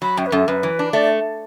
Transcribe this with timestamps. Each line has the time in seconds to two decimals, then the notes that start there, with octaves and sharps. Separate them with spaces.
0.02 F#3 B5
0.17 F#2 G5
0.26 B4
0.32 F#2 A4
0.48 F#2 B4
0.63 E3
0.79 D4
0.93 A3 D5